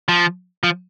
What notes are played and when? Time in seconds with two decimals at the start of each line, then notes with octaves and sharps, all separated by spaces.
0.09 F3
0.63 F3